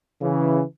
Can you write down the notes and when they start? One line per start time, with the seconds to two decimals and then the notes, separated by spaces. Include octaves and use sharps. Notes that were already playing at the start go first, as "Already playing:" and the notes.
0.20 C#3 E3